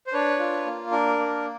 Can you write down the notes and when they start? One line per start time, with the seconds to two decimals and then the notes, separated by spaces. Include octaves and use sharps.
0.07 C5
0.13 D4 B4 C#5
0.39 F4
0.66 A#3
0.91 D4 A#4
1.18 A#3